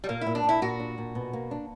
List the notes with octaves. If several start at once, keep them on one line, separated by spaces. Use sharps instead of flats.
G3
A#2 A#3
E4
A#2
D4
A#2 E4
A#2 F#4
D4
A#2
B2
A#3
D4